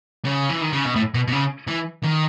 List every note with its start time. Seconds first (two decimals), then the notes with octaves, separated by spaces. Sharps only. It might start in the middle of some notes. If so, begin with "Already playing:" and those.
0.25 C#3
0.49 E3
0.61 D#3
0.73 C#3
0.85 B2
0.96 A2
1.14 B2
1.27 B2
1.32 C#3
1.68 E3
2.04 D#3